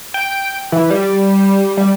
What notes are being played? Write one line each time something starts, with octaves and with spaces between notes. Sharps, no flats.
G5
E3
G3
G3